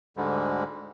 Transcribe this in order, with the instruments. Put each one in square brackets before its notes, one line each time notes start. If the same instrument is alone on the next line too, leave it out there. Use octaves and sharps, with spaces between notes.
[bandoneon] D2 G#2 D3 G3 G#3